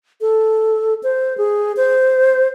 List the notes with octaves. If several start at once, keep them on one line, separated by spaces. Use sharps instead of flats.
A4
C5
G#4
C5